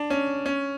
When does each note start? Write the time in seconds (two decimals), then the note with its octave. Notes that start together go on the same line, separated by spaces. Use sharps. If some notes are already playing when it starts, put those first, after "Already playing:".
Already playing: D4
0.10 C#4
0.46 C#4